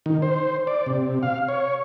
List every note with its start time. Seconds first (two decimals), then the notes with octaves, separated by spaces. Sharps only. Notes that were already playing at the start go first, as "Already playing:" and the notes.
0.06 D#3
0.22 C5
0.67 D5
0.86 C3
1.23 F5
1.48 C#5